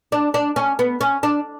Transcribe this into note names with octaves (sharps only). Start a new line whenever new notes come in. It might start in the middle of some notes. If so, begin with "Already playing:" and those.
D4
D4
C#4
B3
C#4
D4